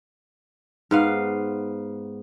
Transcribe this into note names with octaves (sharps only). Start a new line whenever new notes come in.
G#2 B3 F5